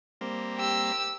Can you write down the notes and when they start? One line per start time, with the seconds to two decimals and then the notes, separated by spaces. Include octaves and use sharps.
0.21 G3 A#3 C4
0.58 G4 E6